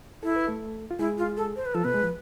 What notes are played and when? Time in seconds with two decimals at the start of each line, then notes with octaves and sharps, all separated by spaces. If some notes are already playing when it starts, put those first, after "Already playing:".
0.23 E4 A4
0.36 B4
0.48 A3 A4
0.91 F4
0.99 G#3 E4 G#4
1.18 F4
1.37 A4
1.56 C5
1.66 B4
1.75 F3 F4 A4
1.84 B2 B3 B4
1.94 G#3
2.04 F3